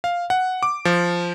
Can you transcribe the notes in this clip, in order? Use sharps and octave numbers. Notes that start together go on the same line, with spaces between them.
F5
F#5
D6
F3